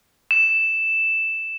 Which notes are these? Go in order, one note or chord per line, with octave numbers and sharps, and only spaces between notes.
E7